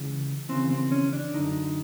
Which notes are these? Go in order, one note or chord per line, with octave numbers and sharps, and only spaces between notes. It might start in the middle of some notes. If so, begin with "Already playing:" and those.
Already playing: C#2 C#3 E3
D#2 C#3 E3 C4
C4
C#4
D4
F#2 D3 D#4